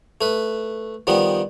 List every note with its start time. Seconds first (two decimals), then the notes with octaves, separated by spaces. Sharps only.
0.21 A3 B4
1.07 D#3 F3 G3 B3